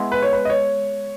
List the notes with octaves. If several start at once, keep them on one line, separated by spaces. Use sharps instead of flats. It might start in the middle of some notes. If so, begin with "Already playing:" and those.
Already playing: G#3 B3 E4
B4
C#5
B4
D#5
C#5